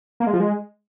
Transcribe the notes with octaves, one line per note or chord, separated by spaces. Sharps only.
A#3
G#3
F3
G#3